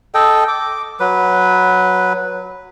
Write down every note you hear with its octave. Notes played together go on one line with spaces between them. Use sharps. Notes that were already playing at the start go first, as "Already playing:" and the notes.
A4 D#5 G5
D6
F#3 B4